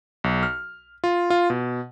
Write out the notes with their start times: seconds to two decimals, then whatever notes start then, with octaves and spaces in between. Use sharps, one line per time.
0.24 B1
0.43 F6
1.04 F4
1.30 F4
1.50 B2